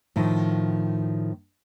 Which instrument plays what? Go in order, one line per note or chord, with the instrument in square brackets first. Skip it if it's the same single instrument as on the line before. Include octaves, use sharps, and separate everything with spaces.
[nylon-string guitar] A2 D#3 F3